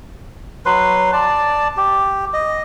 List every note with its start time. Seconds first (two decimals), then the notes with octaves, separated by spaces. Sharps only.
0.66 F#3 B4 C6
1.13 D5 A5
1.77 G4
2.33 D#5